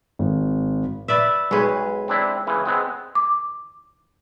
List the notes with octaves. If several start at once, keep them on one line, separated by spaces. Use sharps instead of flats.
G#1
B4 D5 E5
B1 G#3 B4 C#5
C4 D4 E4
C#3 E3
G#3 B3 C4
D6